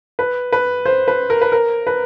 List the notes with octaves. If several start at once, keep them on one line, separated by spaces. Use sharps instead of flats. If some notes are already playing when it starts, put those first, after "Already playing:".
B4
B4
C5
B4
A#4
B4
A#4
B4